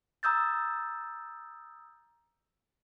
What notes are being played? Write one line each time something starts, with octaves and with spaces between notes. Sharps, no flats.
A#5 D#6 E6 G6 A6